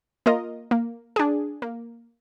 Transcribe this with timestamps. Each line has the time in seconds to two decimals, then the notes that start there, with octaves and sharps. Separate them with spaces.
0.26 A#3 F4 A#4 D#5
0.71 A#3
1.16 D4 G#4
1.62 A#3